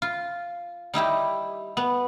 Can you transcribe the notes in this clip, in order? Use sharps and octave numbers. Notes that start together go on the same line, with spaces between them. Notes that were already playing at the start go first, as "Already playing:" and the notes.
F4
G3 D#4 E4 G4
B3